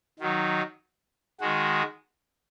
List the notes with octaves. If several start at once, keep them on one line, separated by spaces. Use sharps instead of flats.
D#3 F#3 D#4
D#3 G#3 F#4